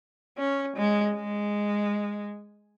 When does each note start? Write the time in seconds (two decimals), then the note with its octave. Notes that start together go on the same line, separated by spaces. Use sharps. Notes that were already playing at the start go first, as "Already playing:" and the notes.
0.38 C#4
0.76 G#3
1.15 G#3